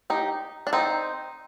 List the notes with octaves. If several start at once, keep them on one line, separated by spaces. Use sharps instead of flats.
D#4 G4
D4
C4 D#4